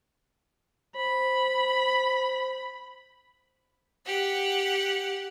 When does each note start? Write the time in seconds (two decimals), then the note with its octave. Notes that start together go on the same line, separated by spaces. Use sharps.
0.96 C5 B5
4.06 G4 F#5